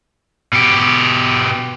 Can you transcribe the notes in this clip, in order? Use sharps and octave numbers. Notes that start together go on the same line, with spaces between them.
B2 G4